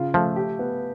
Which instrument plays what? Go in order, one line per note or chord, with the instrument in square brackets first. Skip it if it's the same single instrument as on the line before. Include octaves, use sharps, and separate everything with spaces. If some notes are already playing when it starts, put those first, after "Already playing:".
Already playing: [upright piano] C#3 F4
[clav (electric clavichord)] F3 [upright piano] A3
[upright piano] G4
B3